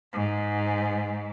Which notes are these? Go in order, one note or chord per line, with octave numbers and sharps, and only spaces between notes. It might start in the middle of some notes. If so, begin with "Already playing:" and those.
G#2